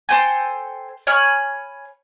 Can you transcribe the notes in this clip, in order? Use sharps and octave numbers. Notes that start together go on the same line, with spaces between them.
A4 C5 G5 G#5
C#5 G#5 B5 F6